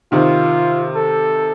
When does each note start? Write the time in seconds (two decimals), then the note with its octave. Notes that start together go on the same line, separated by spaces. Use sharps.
0.12 C3 D#3 F4
0.95 A4